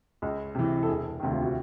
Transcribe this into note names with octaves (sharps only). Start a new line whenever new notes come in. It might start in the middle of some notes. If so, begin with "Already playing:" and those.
C#2
C3 E3
A4
E1 G#4
D2 C3 D#3
F4
F#4